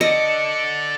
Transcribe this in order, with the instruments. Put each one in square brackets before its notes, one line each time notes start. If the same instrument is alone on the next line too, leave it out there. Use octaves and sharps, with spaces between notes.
[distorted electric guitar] A4 D5 [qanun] D#5 [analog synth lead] C#7